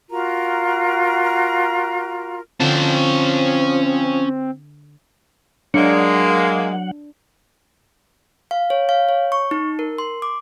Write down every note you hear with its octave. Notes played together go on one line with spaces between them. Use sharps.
F4 F#4 A#4 A#5
D3 F3 C4 C#4 F#5 A5 G6
F#3 G#3 A#3 D4 F#5
F5
C#5
F5
C#5
C#6
D#4
A#4
C6
D6